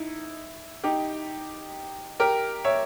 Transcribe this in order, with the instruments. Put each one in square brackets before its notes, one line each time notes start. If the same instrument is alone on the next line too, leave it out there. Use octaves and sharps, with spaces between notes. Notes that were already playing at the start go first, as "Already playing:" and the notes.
Already playing: [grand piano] D#4 E4
D#4 G4
G4 A#4
C#5 E5